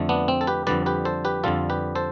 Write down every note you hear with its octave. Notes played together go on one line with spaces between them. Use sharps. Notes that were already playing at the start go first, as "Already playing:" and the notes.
Already playing: F2 D3 A3
B3 D4
C4
A4
G4 B4
F2 D3 G3 B4 D5
G4 B4
A4 C5
G4 B4
F2 D3 G3 F4 A4
G4 B4
A4 C5